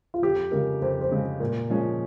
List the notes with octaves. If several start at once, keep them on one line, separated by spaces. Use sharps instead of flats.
F4
F2 G4
C#3 G#3 A#4
F2 C5
C5
C#3 G#3
A#2 A#4
F3 G#3 C#4